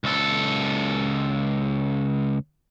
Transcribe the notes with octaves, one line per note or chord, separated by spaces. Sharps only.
C#2 A4